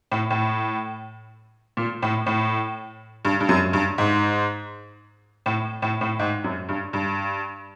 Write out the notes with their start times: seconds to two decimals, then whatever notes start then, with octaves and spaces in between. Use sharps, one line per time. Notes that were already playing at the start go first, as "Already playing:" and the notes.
0.11 A2
0.30 A2
1.77 A#2
2.02 A2
2.26 A2
3.25 G2
3.40 G2
3.49 F#2
3.73 G2
3.98 G#2
5.46 A2
5.82 A2
6.01 A2
6.19 G#2
6.44 F#2
6.69 G2
6.93 G2